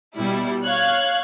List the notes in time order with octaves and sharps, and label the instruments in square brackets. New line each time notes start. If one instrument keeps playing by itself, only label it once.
[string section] B2 G3 E4
C#5 F5 F#6 G#6